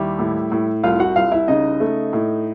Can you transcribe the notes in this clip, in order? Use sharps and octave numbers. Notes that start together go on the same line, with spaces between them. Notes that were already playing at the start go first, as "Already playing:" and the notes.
Already playing: D#2 G3 E4
A2
A2
C2 F4 F5
F#4 F#5
C2 F4 F5
E4 E5
C#3 D#4 D#5
A3
A2